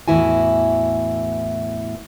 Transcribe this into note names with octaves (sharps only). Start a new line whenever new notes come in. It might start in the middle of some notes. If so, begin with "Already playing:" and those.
E2 A2 E3 E4 F#4 G#5